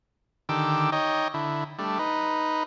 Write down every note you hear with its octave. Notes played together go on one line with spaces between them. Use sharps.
D3 D#3 G4 D6 E6
D#4 C#5 D#5 G5
D3 E4
G3 A3 D4
D#4 B4